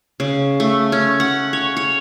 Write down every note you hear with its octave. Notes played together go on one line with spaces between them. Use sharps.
C#3
A3
C#4
F#5
C#5
C#5